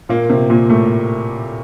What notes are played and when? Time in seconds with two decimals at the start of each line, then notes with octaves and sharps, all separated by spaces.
0.09 A#2 A#3
0.30 C3 C4
0.50 A#2 A#3
0.70 A2 A3